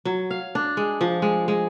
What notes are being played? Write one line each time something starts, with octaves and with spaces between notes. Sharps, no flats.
F#3
F5
D4
G#3
F3
G#3
G#3